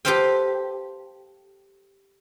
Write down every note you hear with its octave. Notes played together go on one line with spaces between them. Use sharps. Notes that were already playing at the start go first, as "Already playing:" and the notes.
G4 A4 B4 C5 F5 G5